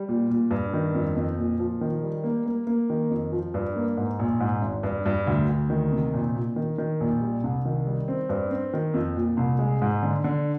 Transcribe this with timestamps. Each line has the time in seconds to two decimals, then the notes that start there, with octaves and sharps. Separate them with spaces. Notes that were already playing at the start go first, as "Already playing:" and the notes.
Already playing: G3
0.08 A#2
0.30 A#2
0.51 G2
0.73 D#3
0.95 F2
1.17 F2
1.38 A#2
1.59 F3
1.81 D#3
2.03 G3
2.24 A#3
2.46 A#3
2.67 A#3
2.90 D#3
3.10 F2
3.32 F3
3.54 G2
3.76 A#3
3.97 G#2
4.19 A#1
4.40 G#2
4.62 G#1
4.83 G2
5.06 G2
5.27 D2
5.49 D2
5.70 D#3
5.92 C3
6.14 A#1
6.35 A#2
6.56 D#3
6.78 D#3
7.00 A#1
7.21 G3
7.44 C2
7.65 D#3
7.87 G3
8.08 C4
8.29 G2
8.51 C4
8.73 D#3
8.94 F2
9.16 A#2
9.37 C2
9.59 G#3
9.82 G#2
10.03 D3
10.24 D3